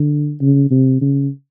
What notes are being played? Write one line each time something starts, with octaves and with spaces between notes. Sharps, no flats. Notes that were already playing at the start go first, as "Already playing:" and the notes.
Already playing: D3
C#3
C3
C#3